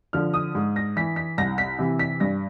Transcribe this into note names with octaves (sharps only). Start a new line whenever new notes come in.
D3 F3 F6
D#6
G#2
A#6
E3 B6
B6
C2 A#6
B6
C3 E3
B6
G2 A#6